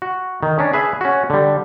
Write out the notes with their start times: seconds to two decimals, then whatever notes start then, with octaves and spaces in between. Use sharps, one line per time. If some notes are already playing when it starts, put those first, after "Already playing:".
0.02 F#4
0.43 D#3
0.59 C#4 D4
0.73 G#4 B4 E5
1.01 C#4 F#4
1.30 D3 G3